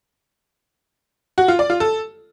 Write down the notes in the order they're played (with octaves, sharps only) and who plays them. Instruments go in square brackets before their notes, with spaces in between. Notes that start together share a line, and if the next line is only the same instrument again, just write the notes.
[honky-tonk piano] F#4
F4
D5
F4
A4